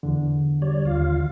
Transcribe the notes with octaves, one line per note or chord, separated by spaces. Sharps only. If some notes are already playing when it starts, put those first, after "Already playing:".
E2 D3
G3 C#5 D5
D#2 F4 F5